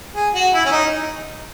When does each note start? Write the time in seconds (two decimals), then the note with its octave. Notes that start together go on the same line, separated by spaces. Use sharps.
0.15 G#4
0.33 F#4
0.54 E4
0.65 C#4
0.72 D#4